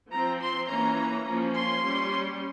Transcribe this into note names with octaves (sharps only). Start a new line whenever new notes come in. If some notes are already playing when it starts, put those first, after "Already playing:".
F3 C4 A#5
C6
E3 A#3 C#4 A#5
F3 A#3 C#4
C6
G3 C#4